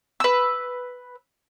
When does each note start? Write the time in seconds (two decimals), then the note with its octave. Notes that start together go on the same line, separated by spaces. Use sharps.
0.20 B4 E6